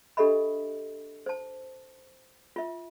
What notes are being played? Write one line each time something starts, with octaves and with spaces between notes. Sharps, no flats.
D4 G4 A4 D#5 E5 B5
C5 A5
F4 E5